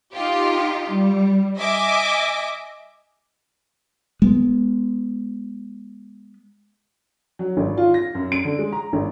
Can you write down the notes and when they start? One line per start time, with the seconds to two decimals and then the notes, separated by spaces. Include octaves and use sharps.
0.13 D#4 F4 G4
0.91 G3
1.58 D#5 E5 G#5 D6
4.22 G#3 B3
7.39 F#3
7.57 G#1
7.77 F4
7.94 A#6
8.15 F#2
8.32 D7
8.45 D3
8.59 G#3
8.73 A#5
8.93 G#1